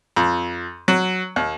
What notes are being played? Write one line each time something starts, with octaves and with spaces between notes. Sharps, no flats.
F2
F#3
D#2